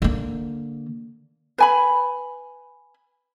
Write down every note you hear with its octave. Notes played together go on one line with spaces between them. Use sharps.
D3 A#3
B4 G#5 B5